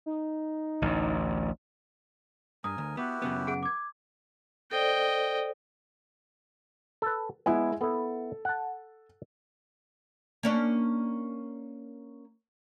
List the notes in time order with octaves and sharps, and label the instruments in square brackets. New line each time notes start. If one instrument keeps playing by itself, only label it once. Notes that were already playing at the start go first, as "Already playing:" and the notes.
[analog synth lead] D#4
[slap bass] A1 D2
[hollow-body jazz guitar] G2 [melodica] A#4 G#5 [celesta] D#6
[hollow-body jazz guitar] D2
[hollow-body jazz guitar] B3 [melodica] E4 F#4 G4
[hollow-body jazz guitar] F#2 C#3 B3
[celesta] G#4 F#5 D7
D6 G#6
[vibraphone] A4 C5 D5 [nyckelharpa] D#5 G5
[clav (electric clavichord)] A4 B4
[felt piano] G#3 E4 G#5 [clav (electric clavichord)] B3
[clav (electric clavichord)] B3 E4 [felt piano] A4
[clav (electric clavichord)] F#5 A5
[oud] A#3 C#4 D4